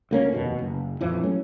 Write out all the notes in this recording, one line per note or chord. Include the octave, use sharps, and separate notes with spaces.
D2 A#3 C#4
F1 D#2 B2
F#1
A#1 F2 E3 F3
F#3 A3 C#4